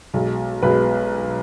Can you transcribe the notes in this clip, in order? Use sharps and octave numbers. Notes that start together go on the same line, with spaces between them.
B1 B2 G#3
B1 B2 G#3 B4